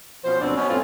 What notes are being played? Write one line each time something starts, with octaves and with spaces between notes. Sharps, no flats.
B2 F3 C#4 C5
D2 B2 F#3 C4 D4
B2 C#4
F2 A2 G3 C4 C#4 F4